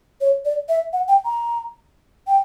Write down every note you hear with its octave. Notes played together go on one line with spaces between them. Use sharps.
C#5
D5
E5
F#5
G5
A#5
G5